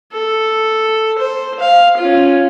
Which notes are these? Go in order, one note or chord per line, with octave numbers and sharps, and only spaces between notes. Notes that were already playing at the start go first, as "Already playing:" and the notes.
A4
C5
F5
C#4 F4